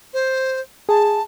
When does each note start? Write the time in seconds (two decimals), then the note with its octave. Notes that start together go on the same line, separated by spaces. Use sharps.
0.13 C5
0.89 G#4 A5